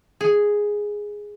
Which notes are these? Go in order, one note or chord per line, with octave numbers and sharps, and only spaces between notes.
G#4